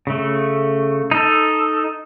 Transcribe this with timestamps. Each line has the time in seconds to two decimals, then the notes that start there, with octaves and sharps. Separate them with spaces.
0.07 C#3 A3
1.11 D#4 A4